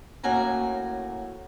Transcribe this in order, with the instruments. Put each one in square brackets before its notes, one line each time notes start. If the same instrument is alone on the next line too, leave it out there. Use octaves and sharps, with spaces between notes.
[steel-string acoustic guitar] A2 A#3 C#4 F#4 G#5 A#5